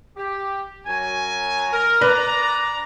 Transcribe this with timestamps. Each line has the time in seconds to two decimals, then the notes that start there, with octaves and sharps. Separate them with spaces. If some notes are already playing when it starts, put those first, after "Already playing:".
0.17 G4
0.87 F#2 F#3 G#5
1.72 A#4
2.01 D4 B4 D5 A#5